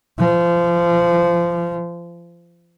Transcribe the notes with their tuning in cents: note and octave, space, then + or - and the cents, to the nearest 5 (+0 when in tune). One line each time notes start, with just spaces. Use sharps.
F3 -25